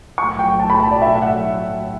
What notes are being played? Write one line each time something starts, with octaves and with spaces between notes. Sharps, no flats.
B1 A2 F#3 A3 C#6
G5
A5
B5
A5
D5
E5
F#5